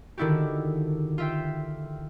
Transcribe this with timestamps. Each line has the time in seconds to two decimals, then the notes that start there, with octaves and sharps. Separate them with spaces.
0.18 D3 D#3 D4 E4 F#4 G4
1.18 F4 E5 G5